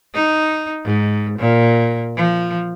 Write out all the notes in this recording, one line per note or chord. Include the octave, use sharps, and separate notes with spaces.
D#4
G#2
A#2
F3